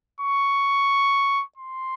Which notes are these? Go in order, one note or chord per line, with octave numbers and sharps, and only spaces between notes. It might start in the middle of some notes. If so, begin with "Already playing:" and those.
C#6
C6